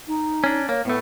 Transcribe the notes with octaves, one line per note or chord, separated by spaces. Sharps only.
D#4
C#4 D4
A#3 C#5
A2 A3 B3